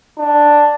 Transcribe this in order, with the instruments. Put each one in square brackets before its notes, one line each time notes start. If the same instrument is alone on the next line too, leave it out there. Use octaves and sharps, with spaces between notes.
[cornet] D4